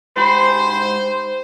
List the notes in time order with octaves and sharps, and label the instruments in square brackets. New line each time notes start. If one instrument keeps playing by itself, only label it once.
[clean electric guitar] G#2 G4 B5 [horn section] C5